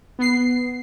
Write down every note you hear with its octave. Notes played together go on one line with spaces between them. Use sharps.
B3 C7